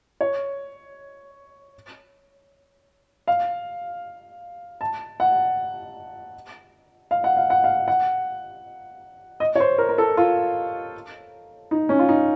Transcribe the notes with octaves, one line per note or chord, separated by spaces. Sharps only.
C#5
F5
A5
F#5
F5
F#5
F5
F#5
F5
F#5
D#5
C#5
C5
A#4
A#4
A4
F4
D#4
C#4
F4
D#4